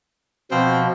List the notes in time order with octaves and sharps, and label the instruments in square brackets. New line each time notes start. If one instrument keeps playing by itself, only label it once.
[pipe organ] B2 F3 [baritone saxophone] C4